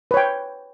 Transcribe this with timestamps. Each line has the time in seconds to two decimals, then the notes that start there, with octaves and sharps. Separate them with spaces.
0.11 B4
0.14 C#5
0.17 G5